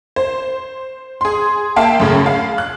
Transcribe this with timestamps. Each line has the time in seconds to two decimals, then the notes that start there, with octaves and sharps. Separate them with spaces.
0.16 C5
1.21 G#4 C6
1.76 A#3 E5 F5 G5 A5
2.00 F#2 A2 C#3
2.26 F5
2.58 F#6